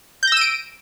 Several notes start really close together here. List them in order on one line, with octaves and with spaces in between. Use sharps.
G6 A#6 E6 D#7 D7